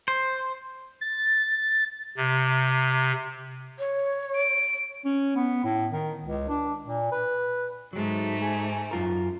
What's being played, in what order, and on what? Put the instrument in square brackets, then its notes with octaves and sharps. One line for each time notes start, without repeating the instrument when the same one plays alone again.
[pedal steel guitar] C5
[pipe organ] A6
C3
[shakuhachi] C#5
[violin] D7
[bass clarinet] C#4
B3
A2
D#3
C#2
D4
A#2
B4
[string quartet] G#2 A3 D#4 [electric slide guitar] F#3 G#3
[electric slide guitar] G#4
F#2 F4 A#4